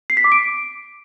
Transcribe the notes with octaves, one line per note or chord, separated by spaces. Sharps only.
C7
B6
D6
D7